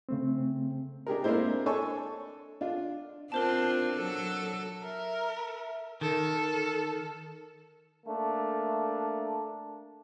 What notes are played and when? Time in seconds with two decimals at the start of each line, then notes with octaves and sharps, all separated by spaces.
0.09 C#3 A3 C4
1.07 D4 G4 G#4 A#4
1.24 G#3 A#3 C4 D4 E4 C5
1.66 D4 A4 C#5 G#5 A5 C#6
2.61 D4 F4
3.32 C4 D4 F4 A#4 C5 A5
3.94 F#3 A4
4.82 A#4 E5
6.01 D#3 A4 A#4
8.05 A3 A#3 D4